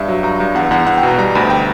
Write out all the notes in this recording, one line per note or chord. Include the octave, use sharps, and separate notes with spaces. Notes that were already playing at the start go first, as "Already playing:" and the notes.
Already playing: G2 E5
F#3
G2 A#5
G2
E2 F#5
E2 F#5
E2 F#5
G5
B2 A#5
G3 A#5
D2 B5
G5